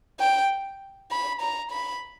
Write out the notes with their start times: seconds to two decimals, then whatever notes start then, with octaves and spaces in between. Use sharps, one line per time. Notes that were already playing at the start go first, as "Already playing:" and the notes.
0.20 G5
1.11 B5
1.41 A#5
1.71 B5